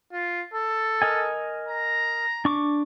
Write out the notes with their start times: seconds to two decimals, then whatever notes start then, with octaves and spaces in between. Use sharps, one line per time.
0.13 F4
0.54 A4
1.02 A#4 D#5 G#5
1.69 A#5
2.45 D4 C#6 D6